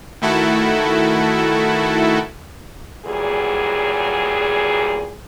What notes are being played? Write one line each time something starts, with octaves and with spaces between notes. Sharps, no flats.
D#3 A3 E4 F#4 A4
E2 A#2 F#3 G3 G#4